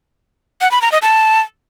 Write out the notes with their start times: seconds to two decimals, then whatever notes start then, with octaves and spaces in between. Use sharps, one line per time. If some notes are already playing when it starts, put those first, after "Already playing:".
0.61 F#5
0.71 B5
0.82 A#5
0.92 D#5
1.02 A5